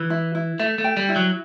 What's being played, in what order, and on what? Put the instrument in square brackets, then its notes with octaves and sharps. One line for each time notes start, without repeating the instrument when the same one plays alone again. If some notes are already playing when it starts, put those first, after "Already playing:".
Already playing: [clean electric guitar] E3
[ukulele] E4
E4
[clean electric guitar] A3 [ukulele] E5
[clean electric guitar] A3
[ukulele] G5
[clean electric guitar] G3
[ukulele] E4
[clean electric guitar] F#3